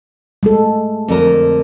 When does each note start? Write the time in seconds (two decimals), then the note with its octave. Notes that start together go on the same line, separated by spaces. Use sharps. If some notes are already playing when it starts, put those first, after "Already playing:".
0.43 G#3 A3 A4
1.08 F2 D3 A#4